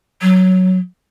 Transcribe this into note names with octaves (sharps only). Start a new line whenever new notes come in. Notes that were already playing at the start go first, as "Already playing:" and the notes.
F#3